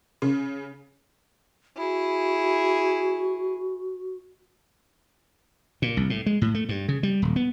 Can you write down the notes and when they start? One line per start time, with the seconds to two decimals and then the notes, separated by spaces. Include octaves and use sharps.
0.22 C#3
1.77 E4 F#4 G#4
5.82 A#2
5.97 C2
6.10 A2
6.26 G#3
6.41 A2
6.54 A3
6.69 G2
6.88 C#3
7.03 G3
7.22 D#1
7.36 B3